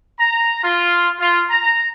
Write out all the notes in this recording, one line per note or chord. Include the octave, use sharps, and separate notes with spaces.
A#5
F4
F4
A#5